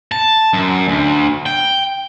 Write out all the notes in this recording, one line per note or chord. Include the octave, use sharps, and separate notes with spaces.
A5
F#2
D2
G5